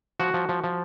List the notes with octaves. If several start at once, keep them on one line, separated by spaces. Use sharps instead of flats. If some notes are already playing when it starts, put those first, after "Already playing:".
F3 F#4
F3
F3
F3